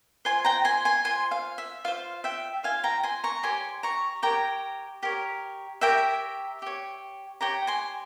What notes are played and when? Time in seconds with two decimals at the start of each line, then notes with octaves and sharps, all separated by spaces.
0.25 F4 C5 G#5 C6
0.45 G5 A#5
0.65 G#5 C6
0.85 G#5 C6
1.05 F4 C5 G#5 C6
1.31 F5
1.58 E5
1.84 F4 C5 F5
2.24 E5 G5
2.63 F4 C5 F5 G#5
2.84 G5 A#5
3.03 G#5 C6
3.24 A#5 C#6
3.43 G4 A#4 C#5 G#5 C6
3.83 A#5 C#6
4.22 G4 A#4 C#5 G5 A#5
5.03 G4 A#4 C#5
5.81 G4 A#4 C#5 E5 G5
6.62 G4 C#5
7.41 G4 C#5 G5 A#5
7.67 G#5 C6